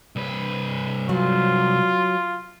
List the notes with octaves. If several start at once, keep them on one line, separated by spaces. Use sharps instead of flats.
C2 B4
F#3 F4